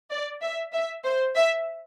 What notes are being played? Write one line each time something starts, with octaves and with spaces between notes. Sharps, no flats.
D5
E5
E5
C5
E5